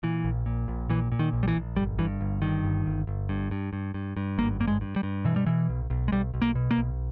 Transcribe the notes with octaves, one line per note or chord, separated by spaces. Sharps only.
A#2 E3
A#1
A#2
A#1
A#2 E3
A#2
D#3
A#1
G3
E3
A#1
G1 G3
G2 E3
G1
G2 D#3
G1
G1
G1
G2
G2
G2
G2
G2
G#1 A#3
G2 A#3
G#3
G2
G3
G2
B2 E3
G3
B2 E3
B1
B1
G#3
B1 G3
B1
A#3
B2
A#3
B1